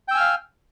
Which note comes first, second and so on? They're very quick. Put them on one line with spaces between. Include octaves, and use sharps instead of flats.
G5 E6 G#5 F6 F5